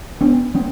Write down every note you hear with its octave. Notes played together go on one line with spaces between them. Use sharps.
B3 D4
A#3 C#4